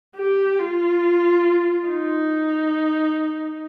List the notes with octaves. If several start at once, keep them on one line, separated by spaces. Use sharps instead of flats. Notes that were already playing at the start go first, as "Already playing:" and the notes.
G4
F4
D#4